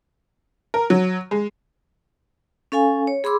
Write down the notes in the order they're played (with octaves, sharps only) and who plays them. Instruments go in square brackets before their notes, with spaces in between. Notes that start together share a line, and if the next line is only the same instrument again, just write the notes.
[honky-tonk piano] A#4
F#3
G#3
[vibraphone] C#4 A4 F5 G#5
C#5
G#4 B5 C6 D6 E6